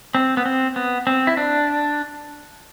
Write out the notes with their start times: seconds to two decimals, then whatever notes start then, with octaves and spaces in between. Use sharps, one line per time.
0.15 C4
0.37 B3
0.46 C4
0.76 B3
1.07 C4
1.27 E4
1.37 D4